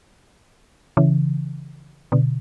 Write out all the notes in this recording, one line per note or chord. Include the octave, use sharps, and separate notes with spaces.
C#3 E3
B2 D3